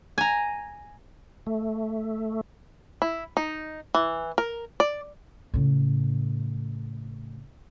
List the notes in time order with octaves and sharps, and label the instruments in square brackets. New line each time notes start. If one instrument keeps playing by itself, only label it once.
[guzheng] G#5 A#5
[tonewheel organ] A3
[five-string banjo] E4
D#4
E3
A#4
D5
[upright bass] A2 C#3